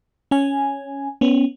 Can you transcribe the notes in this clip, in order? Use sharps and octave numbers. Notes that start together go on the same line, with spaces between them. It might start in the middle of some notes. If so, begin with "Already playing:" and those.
C#4 G#5
B3 C#4